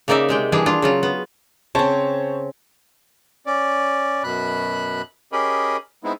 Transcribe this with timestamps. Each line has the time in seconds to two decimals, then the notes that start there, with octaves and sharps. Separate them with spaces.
0.08 C#3 A#3 D#4 D5 E5
0.29 C3 G#3 G5
0.52 E3 G3 D4 G#4
0.66 D4 F4
0.82 C#3 F#3 F4
1.03 B3
1.75 C#3 C4 C5 C#5 A5
3.46 C#4 D5
4.24 F#2 B2 B5 F#6
5.32 C#4 G4 G#4 A#4 D#5 B5
6.04 G#3 B3 C4 D#4 E4